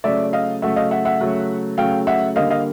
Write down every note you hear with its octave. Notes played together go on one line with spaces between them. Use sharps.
C#3 F#3 A3 D5 E5
D#5 F5
C#3 F#3 A3 E5 F#5
D#5 F5
E5 F#5
E5 F#5
C#3 F#3 A3
C#3 F#3 A3 F5 G5
E5 F#5
D3 G3 A#3 D#5 F5
D#5 F5